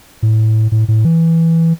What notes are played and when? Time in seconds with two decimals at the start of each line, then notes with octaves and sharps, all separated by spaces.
0.23 A2
0.72 A2
0.88 A2
1.05 E3